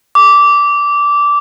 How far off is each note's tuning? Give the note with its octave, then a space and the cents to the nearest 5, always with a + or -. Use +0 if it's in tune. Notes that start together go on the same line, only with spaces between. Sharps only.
D6 -15